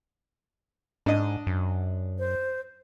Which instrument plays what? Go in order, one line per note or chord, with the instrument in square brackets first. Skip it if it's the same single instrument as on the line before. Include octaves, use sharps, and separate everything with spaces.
[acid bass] G#2 [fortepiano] D4 D#5
[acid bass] F#2
[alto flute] C5